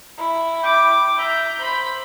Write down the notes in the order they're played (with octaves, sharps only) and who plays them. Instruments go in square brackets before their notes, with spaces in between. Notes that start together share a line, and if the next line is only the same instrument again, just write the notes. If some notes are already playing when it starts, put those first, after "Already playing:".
[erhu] E4
[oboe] G5 [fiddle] D6
[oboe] E5 [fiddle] A#5 [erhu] G6
[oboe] C5 [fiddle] B5